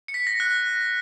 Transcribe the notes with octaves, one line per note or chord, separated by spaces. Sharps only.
C#7
B6
A#6
F#6